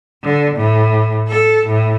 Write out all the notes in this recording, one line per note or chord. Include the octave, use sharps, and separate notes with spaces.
D3
A2
A4
A2